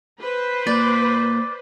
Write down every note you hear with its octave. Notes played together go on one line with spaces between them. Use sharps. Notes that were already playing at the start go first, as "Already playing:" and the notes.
B4 C5
A#2 D5